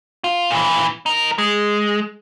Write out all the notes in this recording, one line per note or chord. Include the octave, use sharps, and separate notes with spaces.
F4
A#2 E3
D#4 A#4
G#3